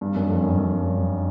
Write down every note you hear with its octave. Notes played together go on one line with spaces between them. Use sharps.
G2
F#2
F2
F#2
F#2
G2